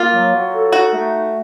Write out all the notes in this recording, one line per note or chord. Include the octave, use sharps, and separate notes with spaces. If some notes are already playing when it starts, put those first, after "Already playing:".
Already playing: A#3 F4
F#3
F#3
A4
D#4 F#4
A3